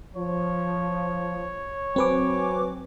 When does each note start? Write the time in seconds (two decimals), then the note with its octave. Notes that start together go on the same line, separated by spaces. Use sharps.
0.16 F3 C#5
1.96 F#3 C4 B4 G#5 D6